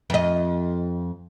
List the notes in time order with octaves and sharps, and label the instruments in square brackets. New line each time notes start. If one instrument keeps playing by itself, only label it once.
[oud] F2 D#5